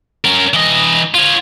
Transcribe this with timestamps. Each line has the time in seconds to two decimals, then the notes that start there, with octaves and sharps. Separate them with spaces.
0.25 C#4 A#4
0.54 E3 D#5
1.14 F4 C#5